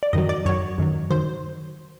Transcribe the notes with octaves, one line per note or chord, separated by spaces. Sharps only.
D5
F#2 D#3 F#3 D#5
D5
F#2 D#3 F#3 C#5
F#2 D#3 F#3
D#3 F#3 C5